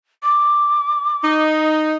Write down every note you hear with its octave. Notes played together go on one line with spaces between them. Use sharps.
D6
D#4